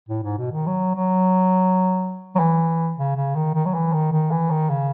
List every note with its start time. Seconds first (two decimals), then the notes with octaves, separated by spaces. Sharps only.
0.09 A2
0.23 G#2
0.38 B2
0.52 D#3
0.67 F#3
0.96 F#3
2.35 F#3
2.39 E3
2.97 C#3
3.16 C#3
3.35 D#3
3.55 D#3
3.65 F#3
3.74 E3
3.93 D#3
4.12 D#3
4.31 E3
4.51 D#3
4.70 C#3